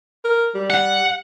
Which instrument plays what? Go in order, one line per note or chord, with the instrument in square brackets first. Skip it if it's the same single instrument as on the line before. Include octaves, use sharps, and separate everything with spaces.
[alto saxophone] A#4
G3
[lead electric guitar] F#5